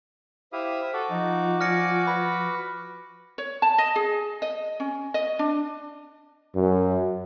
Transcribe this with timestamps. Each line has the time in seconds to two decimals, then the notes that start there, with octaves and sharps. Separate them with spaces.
0.53 E4 G4 C5 E5 F5 D#6
0.93 F#4 A4 F#5 D6
1.10 F3 D#4
1.61 D5 G#5 F6 A#6 C#7
2.07 B4 B5
3.38 C#5
3.62 A5
3.78 D#5
3.96 G#4
4.42 D#5
4.80 C#4
5.14 D#5
5.39 D4
6.55 F#2